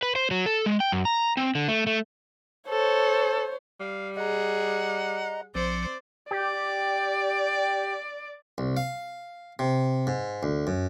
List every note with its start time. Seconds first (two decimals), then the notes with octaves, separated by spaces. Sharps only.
0.03 B4
0.15 C5
0.31 F#3
0.46 A4
0.66 G#3
0.80 G5
0.92 F#2
1.05 A#5
1.37 C4
1.55 D3
1.68 A3
1.87 A3
2.69 A4 C5 C#5
3.80 G3 F5
4.17 G#4 D#5 F#5 A#5
5.55 A#1 F3 C4 C5 D5 C#7
6.31 G4 D5
8.58 C2
8.77 F5
9.59 C3
10.07 G#2
10.43 D2
10.67 F#2